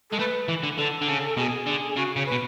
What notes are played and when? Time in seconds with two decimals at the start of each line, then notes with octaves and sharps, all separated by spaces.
0.11 G#3 A4
0.19 A3 B4
0.48 E3
0.63 D3
0.78 D3 A4
1.02 D3
1.08 C#3
1.37 B2 G#4
1.66 D3
1.96 C#3 F#4
2.16 C#3 C#5
2.26 B4
2.32 B2